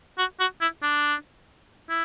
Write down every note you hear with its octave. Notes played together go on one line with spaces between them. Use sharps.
F#4
F#4
E4
D4
E4